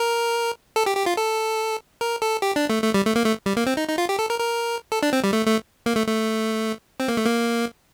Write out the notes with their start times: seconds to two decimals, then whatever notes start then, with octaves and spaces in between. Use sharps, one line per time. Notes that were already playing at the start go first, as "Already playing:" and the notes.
Already playing: A#4
0.76 A4
0.86 G4
0.97 G4
1.06 F4
1.17 A4
2.01 A#4
2.22 A4
2.42 G4
2.56 D4
2.70 A3
2.83 A3
2.94 G3
3.05 A3
3.16 A#3
3.26 A3
3.46 G3
3.57 A#3
3.66 C4
3.77 D#4
3.88 D#4
3.98 F4
4.09 G4
4.19 A4
4.30 A#4
4.40 A#4
4.92 A4
5.03 D4
5.13 C4
5.24 G3
5.33 A3
5.47 A3
5.86 A#3
5.96 A3
6.07 A3
7.00 C4
7.08 A#3
7.17 A3
7.25 A#3